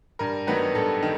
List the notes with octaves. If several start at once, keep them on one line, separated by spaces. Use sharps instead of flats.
G2 A#4
D#3 F#3 B3 B4
G2 A4
D#3